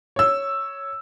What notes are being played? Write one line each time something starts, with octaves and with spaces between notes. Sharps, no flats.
C#5 E6